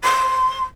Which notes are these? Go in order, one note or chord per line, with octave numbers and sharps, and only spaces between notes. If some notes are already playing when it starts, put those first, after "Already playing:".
C6